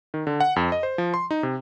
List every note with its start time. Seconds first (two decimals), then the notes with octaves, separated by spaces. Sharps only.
0.14 D#3
0.27 D3
0.40 F#5
0.56 F2
0.72 D#5
0.83 C5
0.98 F3
1.14 C6
1.31 D#4
1.43 C3